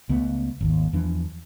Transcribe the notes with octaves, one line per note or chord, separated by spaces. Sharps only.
C#2 A3 B3
G#1 D#2
E2 E3 F3 D4